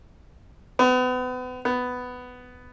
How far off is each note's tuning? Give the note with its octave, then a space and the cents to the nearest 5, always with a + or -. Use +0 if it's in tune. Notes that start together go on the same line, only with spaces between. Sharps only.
B3 +35
B3 +10